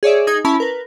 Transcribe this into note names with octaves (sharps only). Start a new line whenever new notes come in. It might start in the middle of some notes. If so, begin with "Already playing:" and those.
G#4 C#5 D5 E5
D#4 G#4 D#6 G#6
C#4 E4 A5 B5
A#4 B4